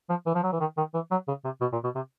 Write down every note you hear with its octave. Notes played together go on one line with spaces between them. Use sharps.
F3
E3
F3
F#3
E3
D#3
D#3
E3
F#3
C#3
C3
B2
A#2
B2
C3